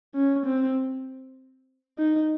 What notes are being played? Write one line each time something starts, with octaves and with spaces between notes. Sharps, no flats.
C#4
C4
D#4